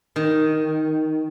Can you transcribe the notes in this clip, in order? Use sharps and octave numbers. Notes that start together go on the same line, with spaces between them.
D#3